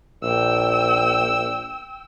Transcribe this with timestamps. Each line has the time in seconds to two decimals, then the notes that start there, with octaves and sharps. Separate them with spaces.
0.23 A#1 G5 E6